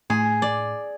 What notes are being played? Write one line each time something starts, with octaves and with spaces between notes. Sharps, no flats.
A2 G#4
D5